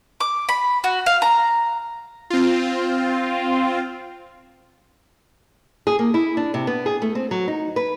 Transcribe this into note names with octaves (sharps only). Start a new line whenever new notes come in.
D6
B5
F#4
F5
A#5
C4 F4
G#4
A#3
E4
D4
C3
B3
G#4
A3
C4
F#3
D#4
B4